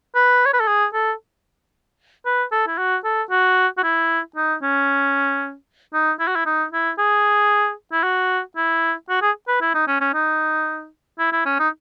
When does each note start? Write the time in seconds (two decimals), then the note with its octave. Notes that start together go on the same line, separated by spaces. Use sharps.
0.15 B4
0.46 C#5
0.53 B4
0.60 A4
0.67 G#4
0.94 A4
2.25 B4
2.52 A4
2.67 E4
2.78 F#4
3.04 A4
3.30 F#4
3.77 F#4
3.83 E4
4.36 D#4
4.62 C#4
5.94 D#4
6.19 E4
6.27 F#4
6.35 E4
6.46 D#4
6.72 E4
6.98 G#4
7.92 E4
8.03 F#4
8.56 E4
9.09 F#4
9.22 G#4
9.48 B4
9.61 E4
9.74 D#4
9.88 C#4
10.01 C#4
10.14 D#4
11.19 E4
11.32 E4
11.45 C#4
11.59 D#4